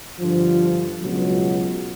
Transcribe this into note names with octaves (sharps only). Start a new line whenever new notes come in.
G2 D3 F3
C#2 B2 F#3